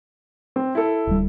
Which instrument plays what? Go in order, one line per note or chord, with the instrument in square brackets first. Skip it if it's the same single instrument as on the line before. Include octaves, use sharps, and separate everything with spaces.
[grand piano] C4
E4 A4
[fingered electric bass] D1 G3